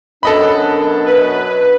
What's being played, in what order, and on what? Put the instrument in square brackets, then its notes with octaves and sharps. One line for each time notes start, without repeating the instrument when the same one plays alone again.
[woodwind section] F#2 B2 D4 [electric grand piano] A4 D#5 B5
[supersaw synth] B4